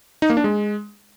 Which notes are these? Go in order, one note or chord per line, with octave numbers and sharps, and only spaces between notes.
D#4
A#3
D4
G#3